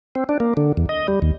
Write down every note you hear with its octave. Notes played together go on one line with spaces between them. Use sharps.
C4
D4
A#3
D3
E2
D#5
G3
D#2